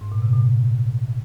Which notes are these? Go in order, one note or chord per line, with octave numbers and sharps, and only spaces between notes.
G#2
A#2
C3
A#2
A#2